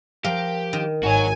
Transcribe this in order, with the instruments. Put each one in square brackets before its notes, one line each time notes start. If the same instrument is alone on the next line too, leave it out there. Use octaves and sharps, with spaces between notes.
[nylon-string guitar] F3 F5 [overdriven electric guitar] G4 [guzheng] A#4
[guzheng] D#3
[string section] G#1 G#5 [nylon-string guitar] D#4 [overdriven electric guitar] F#4 C#5